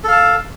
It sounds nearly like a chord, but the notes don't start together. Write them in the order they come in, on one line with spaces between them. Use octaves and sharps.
A4 F5 A5